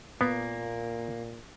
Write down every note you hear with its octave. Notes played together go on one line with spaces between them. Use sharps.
A#2 A#3 B3